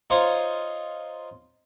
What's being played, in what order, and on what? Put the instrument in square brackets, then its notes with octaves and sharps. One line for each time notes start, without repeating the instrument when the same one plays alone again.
[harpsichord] D#4 F4 C5 C#5